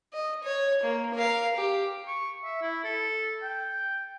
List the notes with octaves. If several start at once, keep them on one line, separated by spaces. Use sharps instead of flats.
D#5
C#5
A#3
A#4 F5
G4
C#6
E5
E4
A4
G5